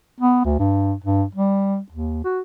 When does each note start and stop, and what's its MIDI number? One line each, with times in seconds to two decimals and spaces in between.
0.20 0.42 59
0.44 0.58 38
0.59 0.94 43
1.04 1.24 43
1.35 1.78 55
1.92 2.24 39
2.25 2.40 66